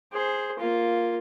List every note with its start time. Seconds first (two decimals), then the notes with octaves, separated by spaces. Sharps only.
0.12 G#4 C5
0.59 A#3 F4